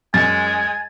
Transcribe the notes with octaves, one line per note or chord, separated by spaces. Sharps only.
F#2 G#3 G#5 A6